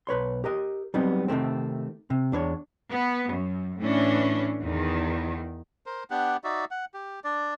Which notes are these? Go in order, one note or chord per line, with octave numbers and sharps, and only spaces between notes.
B1 B4 C#5 C6
G4 A#4 D#5
F#3 G3 B3 C4 D#4
C3 D#3 A3 C4
C3
E2 D4 B4 C#5
B3
F#2
A2 E3 C#4 D4
E2 D#3
A#4 C5
B3 D4 G4 F#5
D#4 F#4 D5 E5
F#5
G4
D4 D5